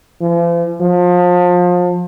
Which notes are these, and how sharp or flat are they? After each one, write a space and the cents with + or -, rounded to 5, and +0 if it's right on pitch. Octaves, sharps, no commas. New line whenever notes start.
F3 -45
F3 +30